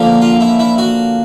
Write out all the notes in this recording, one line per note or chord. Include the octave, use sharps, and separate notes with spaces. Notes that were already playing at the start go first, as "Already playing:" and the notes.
Already playing: D3 F3 A#3 C#4
F4
E4
E4
F#4